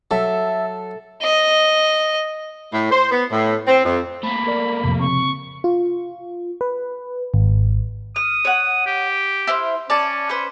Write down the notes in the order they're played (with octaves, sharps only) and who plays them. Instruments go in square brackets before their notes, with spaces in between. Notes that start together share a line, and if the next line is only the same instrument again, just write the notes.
[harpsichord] F#3 [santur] A4 [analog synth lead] E5
[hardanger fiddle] D#5
[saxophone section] A2
C5
B3
A2
C4
F2
[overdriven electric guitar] A3 A#3 [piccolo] B5
[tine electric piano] A#4 D5
[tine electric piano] F2 A2 [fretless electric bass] C3 F3
[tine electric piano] C#3 C4 [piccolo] C#6
[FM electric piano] F4
B4
G#1
[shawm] D#6 [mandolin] F6
[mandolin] C#5 F#5
[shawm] G4
[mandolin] E4 C5 F5
[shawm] C#4 [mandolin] D5 A5
[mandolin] B4 C5